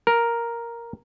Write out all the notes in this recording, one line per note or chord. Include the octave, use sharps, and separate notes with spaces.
A#4